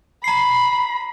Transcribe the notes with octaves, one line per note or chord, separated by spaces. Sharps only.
A#5 B5 C7